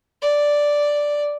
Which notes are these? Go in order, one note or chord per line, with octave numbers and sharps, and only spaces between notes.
D5